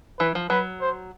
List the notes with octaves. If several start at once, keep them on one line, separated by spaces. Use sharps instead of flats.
E3 B4
F3
F#3 B4
C5